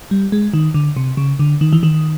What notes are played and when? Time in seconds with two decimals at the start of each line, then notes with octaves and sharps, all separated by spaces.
0.11 G3
0.32 G#3
0.54 D#3
0.74 D3
0.97 C3
1.17 C#3
1.39 D3
1.61 D#3
1.73 E3
1.83 D#3